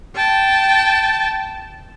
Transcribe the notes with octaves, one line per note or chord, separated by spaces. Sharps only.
G5 A5